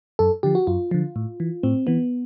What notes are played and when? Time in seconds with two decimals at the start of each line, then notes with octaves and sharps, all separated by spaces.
0.19 F#2 A4
0.43 D3 F3 G4
0.55 F#4
0.67 F#2 F4
0.91 D3 F3
1.16 A2
1.40 E3
1.63 A2 C4
1.87 E3 B3